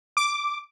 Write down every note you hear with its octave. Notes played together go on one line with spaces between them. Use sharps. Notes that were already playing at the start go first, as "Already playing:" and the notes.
D6